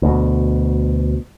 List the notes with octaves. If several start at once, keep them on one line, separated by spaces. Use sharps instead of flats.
D2 B2